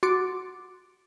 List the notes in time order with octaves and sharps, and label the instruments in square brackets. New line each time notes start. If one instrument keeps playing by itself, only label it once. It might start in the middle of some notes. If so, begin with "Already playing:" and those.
[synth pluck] F#4 C6 D6 A6 D7